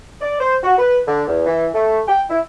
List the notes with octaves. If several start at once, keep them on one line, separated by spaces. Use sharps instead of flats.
D5
C5
F#4
B4
D3
E2
E3
A3
G5
E4